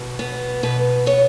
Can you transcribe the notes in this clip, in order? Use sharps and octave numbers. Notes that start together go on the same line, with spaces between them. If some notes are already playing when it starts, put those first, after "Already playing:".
Already playing: B2
B3
B2 B4
B3 C#5